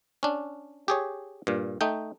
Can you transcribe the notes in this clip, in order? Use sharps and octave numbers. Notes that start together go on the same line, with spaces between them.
C#4 D4
G4 G#4 C#5
G2 A#2
A3 D#4 G5